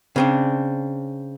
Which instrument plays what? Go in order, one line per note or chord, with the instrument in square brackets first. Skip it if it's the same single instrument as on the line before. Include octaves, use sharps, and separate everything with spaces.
[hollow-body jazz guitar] C#3 C4 D4